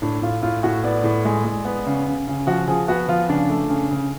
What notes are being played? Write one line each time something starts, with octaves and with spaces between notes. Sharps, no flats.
A2 D4
A2 F4
A2 F4
A2 F#4
B3 D5
A2
G#3
G#3
B3
C#3
C#3
C#3
F3 F#4
F3 G#4
B3 F#4
F3 F4
C#3 D4
A3
C#3
C#3